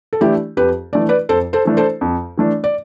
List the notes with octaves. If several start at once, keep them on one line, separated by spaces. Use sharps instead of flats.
A4
E3 A3 D4 E4 G4
F2 G4 B4
E3 A3 D4 D5
B4 D5
F2 A4 C5
A4 C5
E3 A3 D4
A4 C5
F2
E3 A3 D4
D5